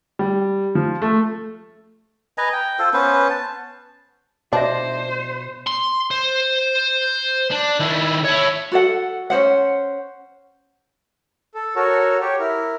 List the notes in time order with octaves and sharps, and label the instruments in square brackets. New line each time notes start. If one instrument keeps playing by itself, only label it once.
[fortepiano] G3
F3
A3
[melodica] B4 D#5 G#5 A#5
G5
F4 A4 C5
B3 C#4 B4 C5
A5
[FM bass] B2 [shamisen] D4 [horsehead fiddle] C5 [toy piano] D#5 E5
[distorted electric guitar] C6
C5
D4
D#3 E4
E4 C#5
[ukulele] F#4 A4 F#5
C#4 D#4 C5 F#5
[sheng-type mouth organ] A4
F#4 A4 A#4 C#5
G4 C#5
E4 A#4